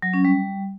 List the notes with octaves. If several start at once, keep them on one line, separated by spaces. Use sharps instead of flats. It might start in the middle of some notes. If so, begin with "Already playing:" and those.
F#3
C#4
G3